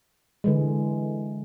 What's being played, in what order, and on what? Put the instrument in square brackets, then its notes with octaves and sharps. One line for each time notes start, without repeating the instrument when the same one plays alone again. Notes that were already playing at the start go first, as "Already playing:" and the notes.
[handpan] D3 E3 G#3